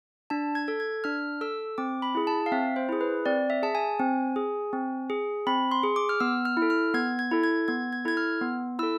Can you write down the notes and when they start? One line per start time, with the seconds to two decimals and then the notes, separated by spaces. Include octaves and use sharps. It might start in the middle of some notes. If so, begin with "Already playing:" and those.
0.30 D4 A5
0.55 G#6
0.68 A4
0.80 G#6
1.04 D4 F6
1.41 A4 E6
1.78 C4 D6
2.02 B5
2.15 E4 G#4
2.27 A5
2.46 F5
2.52 C4 E5
2.76 C5
2.89 E4 G#4
3.01 B4
3.26 C4 D5
3.50 E5
3.62 G#4 A5
3.75 G#5
3.99 C4
4.36 G#4
4.73 C4
5.10 G#4
5.47 C4 B5
5.71 C6
5.83 G#4
5.96 D6
6.09 F6
6.20 B3 E6
6.45 F6
6.57 E4
6.62 A4
6.70 F6
6.94 B3 G#6
7.19 G#6
7.31 E4 A4
7.44 G#6
7.68 B3 G#6
7.93 G#6
8.05 E4 A4 G#6
8.17 F6
8.41 B3
8.79 E4 A4 E6